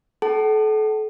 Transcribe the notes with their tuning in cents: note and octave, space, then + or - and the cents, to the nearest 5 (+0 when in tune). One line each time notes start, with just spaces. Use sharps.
A4 -35 F#5 +45 A5 +0